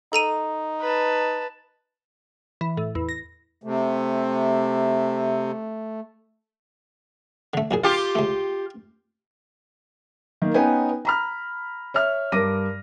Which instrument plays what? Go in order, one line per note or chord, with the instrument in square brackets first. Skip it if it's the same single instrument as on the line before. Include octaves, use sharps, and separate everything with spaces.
[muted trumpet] D#4 [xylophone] A4 A#5 D#7
[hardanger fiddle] B4 A5
[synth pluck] E3
A2
E2
A#6
[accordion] C3 [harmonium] A3
[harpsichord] D3 A3
B1 A#2 G#4
[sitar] F4 G4
[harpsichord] C#2 A3
[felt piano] D#3 A#3
B3 C#4 D#4 B4 G5 G#5
A#5 B5 F6
C#5 E5 F6
G2 A#4 D6 A#6 D#7